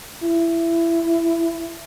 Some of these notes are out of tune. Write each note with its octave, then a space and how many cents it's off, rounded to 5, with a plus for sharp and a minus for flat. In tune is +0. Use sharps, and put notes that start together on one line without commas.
E4 +20